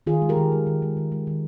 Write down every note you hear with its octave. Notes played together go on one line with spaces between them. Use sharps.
D#3 F4 G#4
G#3
G4 A#4
D#3
G#3
D#3
G#3
D#3
G#3
D#3